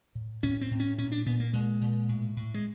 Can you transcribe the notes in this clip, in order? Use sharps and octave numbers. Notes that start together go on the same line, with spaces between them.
A2
A2 C#4
C4
A2
C#4
A#2 C#4
D4
A#2 B3
A#3
A#2 G#3
A#2
A2
A2
G#3